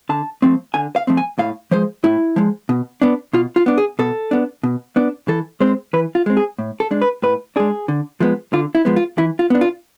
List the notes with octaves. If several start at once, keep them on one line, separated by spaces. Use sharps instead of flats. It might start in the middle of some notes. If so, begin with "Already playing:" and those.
D3 A5
F3 A3 C4
D3 G#5
F5
F3 A3 C4
G#5
A2 F5
F3 G#3 C5
A2 E4
F3 G#3
B2
B3 D4
B2 F4
F4
B3 D4
G#4
B2 A4
B3 D4
B2
B3 D4
E3 A4
G#3 C4 C5
E3 B4
F4
G#3 C4
G#4
A2
A4
G#3 D4
B4
A2 B4
G#3 D4 G#4
D3
F3 G#3 B3
D3 F4
E4
F3 G#3 B3
F4
E3 E4
F4
B3 D4
F4